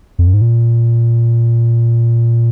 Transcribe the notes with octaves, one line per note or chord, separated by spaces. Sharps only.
F2
F#2
G#2
A#2